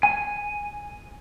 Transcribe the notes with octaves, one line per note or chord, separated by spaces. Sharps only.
G#5